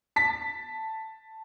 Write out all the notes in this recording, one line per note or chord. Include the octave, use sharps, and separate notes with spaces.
A5 B6